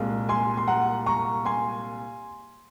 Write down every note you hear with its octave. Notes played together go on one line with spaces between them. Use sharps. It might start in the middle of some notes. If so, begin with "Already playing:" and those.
Already playing: C2 A#2 G#3
G#5 C6
C6
F#5 A#5
A#5 C#6
G#5 C6